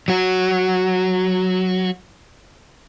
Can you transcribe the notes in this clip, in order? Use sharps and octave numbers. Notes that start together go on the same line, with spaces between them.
F#3 F#4